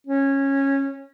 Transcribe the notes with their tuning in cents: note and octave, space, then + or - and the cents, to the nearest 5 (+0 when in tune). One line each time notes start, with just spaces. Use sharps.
C#4 -15